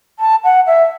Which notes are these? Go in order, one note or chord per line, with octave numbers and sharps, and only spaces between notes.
A5
F#5
E5